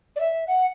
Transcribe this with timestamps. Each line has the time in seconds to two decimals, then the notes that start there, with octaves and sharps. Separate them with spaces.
0.16 D5
0.20 E5
0.47 F#5